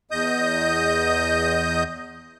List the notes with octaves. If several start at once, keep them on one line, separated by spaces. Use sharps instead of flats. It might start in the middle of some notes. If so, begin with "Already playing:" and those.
E2 D#5 D#6 G6